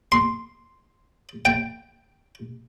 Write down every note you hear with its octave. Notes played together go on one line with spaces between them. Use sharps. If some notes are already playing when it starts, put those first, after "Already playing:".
C6
G5